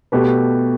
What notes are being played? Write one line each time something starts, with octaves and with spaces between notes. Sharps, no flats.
B2 A3 G4 B4